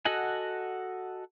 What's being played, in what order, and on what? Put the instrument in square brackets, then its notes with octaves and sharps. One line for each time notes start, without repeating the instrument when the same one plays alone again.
[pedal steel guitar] F#4 A4 D#5 F#5 G#5